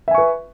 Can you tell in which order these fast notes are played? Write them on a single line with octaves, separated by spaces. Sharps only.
E5 G#5 C#6 B4